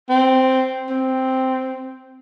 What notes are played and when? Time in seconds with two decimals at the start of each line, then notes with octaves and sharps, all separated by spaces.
0.09 C4
0.89 C4